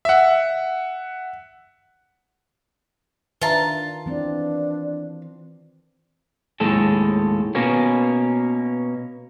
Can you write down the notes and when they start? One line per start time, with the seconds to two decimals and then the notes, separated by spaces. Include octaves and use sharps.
0.05 E5 F#5
3.42 D#3 D4 F4 B4 E5 A5 A#5
4.06 E3 C4 D4
6.60 D#2 A2 G#3 A4
7.55 B2 A#3 C#4